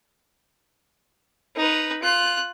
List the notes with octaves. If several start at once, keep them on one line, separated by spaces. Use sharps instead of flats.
D#4 B4
F4 F#6